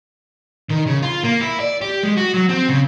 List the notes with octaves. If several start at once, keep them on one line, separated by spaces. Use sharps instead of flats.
D#3
C#3
F4
A#3
E4
D5
G4
G#3
F#4
F#3
C4
C#3